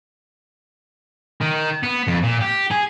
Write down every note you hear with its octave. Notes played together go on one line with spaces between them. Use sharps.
D#3
B3
F2
A#2
G4
G#4